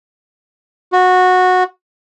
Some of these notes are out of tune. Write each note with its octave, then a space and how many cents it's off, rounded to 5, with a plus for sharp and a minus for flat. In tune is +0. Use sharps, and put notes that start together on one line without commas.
F#4 -15